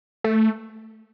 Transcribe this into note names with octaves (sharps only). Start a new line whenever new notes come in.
A3